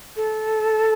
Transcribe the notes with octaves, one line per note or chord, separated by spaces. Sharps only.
A4